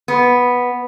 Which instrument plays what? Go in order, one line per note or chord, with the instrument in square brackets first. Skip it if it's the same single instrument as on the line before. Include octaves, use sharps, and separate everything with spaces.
[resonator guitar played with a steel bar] B3